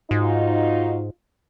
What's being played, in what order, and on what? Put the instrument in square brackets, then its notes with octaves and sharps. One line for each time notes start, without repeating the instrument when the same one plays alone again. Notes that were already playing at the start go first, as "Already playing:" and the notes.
[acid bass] G#2 [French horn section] D#4 F4 F#4